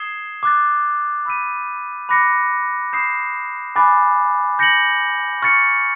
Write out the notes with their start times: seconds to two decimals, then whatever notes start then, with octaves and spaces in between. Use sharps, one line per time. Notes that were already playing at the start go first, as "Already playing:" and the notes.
Already playing: D#6 G#6 C7 E7 G7
0.43 D6 F#6 A6
1.25 B5 E6 G6 B6 D#7
2.09 B5 D6 F#6 A#6 C#7
2.93 B5 D#6 G6 C7 E7
3.76 G#5 B5 D6 F#6 A6
4.59 G6 A#6 C#7 F#7
5.42 C#6 F6 A6 C#7